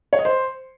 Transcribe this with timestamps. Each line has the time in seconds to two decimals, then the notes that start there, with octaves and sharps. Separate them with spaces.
0.13 C#5
0.19 D#5
0.25 C5